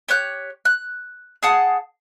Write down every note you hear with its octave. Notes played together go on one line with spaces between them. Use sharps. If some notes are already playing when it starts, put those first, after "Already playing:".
G4 C#5 F#6 G6
F#6
G#4 F#5 A5